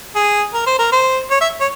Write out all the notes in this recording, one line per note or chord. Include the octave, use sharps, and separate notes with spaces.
G#4
A#4
C5
A#4
C5
C#5
E5
C#5